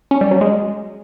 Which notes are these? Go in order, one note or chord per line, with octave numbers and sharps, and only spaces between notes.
C#4
G3
F#3
G#3